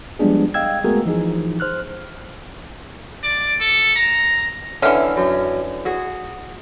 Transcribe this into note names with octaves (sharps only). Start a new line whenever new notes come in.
F3 G3 G#3 B3 D4 G#4
D#5 F5 G5 E6 G#6
G#3 A3 B3 F#4 G#4 A#4
E3 F3 D#4 G#4
C5 F6 F#6
D5
A4
A#5
D3 E3 C#4 E5 F5
F#2
F#4 G#4